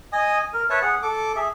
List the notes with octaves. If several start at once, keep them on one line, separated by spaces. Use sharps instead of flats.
D#5 G#5 D#6
A#4
B4 C#5 E5 A5
G#4 F#5
A4 D6
G#4 E5